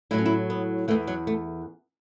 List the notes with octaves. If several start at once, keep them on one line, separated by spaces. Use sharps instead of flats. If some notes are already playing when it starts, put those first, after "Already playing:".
A2 F#3 E4
C#4
E4
B3
E2 E3 A3
F#3
A3